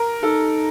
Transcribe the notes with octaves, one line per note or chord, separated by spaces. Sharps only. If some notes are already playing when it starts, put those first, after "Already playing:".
Already playing: A#4
D#4 A4